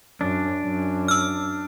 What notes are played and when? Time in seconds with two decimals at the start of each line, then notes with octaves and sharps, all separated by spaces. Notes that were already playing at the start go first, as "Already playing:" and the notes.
0.21 F#2 D4
0.64 F#2
1.08 E6 F6